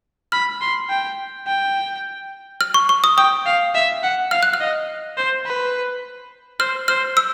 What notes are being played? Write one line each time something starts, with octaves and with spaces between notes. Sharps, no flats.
B5 F6
C6
G5
G5
F6
C#6
C#6
D#6
G5 D#6
F5
E5
F#5
F5 F6
F#6
F6
D#5
C5
B4
C5 F6
C5 F6
E6